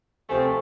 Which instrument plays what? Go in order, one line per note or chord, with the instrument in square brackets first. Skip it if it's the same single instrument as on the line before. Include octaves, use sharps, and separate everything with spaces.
[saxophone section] C3 F3 A3 C4 [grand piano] G#5
[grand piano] A5